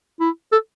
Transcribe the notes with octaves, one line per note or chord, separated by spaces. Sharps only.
E4
A4